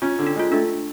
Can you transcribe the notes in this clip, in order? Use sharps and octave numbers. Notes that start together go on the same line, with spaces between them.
C#4 F4
D3
D4
G#3 F4
A3 D4